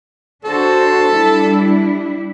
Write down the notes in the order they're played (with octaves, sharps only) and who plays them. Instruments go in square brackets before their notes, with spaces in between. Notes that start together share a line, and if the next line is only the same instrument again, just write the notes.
[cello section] D4 F#4 C5 [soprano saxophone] A4
[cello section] G3 D4 E4